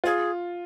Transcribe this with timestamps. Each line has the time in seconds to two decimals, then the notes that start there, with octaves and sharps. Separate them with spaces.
0.04 F4 G#4